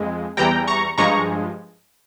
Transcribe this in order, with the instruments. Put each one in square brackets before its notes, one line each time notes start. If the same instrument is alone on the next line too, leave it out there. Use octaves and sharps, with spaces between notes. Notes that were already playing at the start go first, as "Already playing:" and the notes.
Already playing: [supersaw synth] F2 G#3
E2 E3 G3 G5 A#5
A#5 C#6
G2 F3 G#3 A#5 C#6